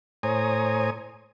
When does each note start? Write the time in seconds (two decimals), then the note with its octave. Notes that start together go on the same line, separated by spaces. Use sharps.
0.23 A2 C5 C#5 G#5 A#5 D#6